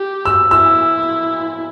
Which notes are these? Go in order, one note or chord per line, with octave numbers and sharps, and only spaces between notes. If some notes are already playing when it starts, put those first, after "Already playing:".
Already playing: G4
E6
E4 E6